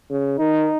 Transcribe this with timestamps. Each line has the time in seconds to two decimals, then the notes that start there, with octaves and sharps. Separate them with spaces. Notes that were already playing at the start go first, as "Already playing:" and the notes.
0.10 C#3
0.39 D#3 D#4